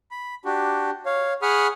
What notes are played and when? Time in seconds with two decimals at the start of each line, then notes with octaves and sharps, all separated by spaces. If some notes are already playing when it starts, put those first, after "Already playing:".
0.11 B5
0.45 D4 F#4 G4
1.06 C#5 F5
1.42 G#4 F#5 B5 C#6 D#6 F6